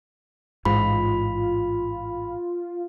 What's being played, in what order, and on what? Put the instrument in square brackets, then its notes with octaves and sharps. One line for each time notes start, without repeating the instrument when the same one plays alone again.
[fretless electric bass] A1 G#2 [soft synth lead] F4 [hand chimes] B5